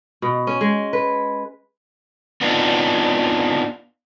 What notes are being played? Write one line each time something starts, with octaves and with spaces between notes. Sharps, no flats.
B2
C#4
G#3
B4
B3 C4 D4 D#4 F4